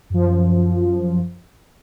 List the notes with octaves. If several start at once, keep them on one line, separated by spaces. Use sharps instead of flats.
F#2 F3